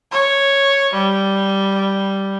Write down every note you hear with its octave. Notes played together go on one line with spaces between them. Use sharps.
C#5
G3